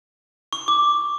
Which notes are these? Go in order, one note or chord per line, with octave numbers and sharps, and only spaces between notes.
C#6
D6